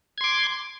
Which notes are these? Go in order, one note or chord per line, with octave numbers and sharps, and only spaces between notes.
C6 D6 G#6